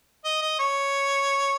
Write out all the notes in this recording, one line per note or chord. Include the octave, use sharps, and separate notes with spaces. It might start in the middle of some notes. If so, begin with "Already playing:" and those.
D#5
D#5
C#5